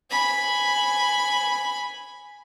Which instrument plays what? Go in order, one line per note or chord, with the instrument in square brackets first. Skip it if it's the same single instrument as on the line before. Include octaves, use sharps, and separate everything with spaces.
[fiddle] G#5 B5